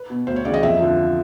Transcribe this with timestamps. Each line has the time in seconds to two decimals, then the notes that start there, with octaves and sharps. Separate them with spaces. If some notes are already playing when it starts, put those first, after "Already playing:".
Already playing: B4
0.10 B2
0.27 D2 C5
0.36 C#5
0.45 C#3 E3 D5
0.54 D#5
0.63 F2 E5
0.80 D3 F3